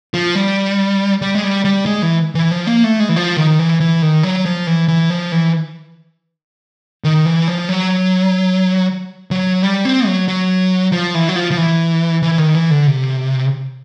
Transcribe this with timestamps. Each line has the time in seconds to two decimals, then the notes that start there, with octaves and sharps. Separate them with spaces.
0.14 F3
0.35 G3
1.22 G3
1.35 G#3
1.44 G3
1.65 G3
1.86 G#3
2.02 E3
2.35 E3
2.51 F3
2.67 A#3
2.84 A3
3.00 G#3
3.09 E3
3.16 F3
3.37 D#3
3.59 E3
3.80 E3
4.02 D#3
4.23 F#3
4.46 F3
4.67 E3
4.88 E3
5.10 F3
5.32 E3
7.04 D#3
7.26 E3
7.48 F3
7.69 F#3
9.31 F#3
9.63 G3
9.85 C4
10.07 F#3
10.28 F#3
10.93 F3
11.15 E3
11.29 F#3
11.36 F3
11.51 F3
11.57 E3
12.22 E3
12.38 D#3
12.55 E3
12.71 D3
12.87 C3